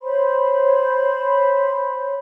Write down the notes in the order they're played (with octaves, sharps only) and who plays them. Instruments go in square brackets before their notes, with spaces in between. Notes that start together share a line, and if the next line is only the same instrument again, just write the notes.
[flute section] C5 C#5 B5 C6